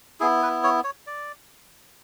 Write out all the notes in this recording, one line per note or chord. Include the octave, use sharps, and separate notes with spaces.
B3 E4 G#4
B4
C#5
C#5
D5